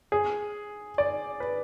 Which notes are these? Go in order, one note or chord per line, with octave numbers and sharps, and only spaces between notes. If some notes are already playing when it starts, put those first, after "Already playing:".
G#4
D5
B4